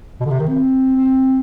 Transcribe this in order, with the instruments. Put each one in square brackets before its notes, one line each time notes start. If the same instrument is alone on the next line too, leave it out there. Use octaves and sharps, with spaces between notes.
[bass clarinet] B2
D3
C3
D#3
C4
C4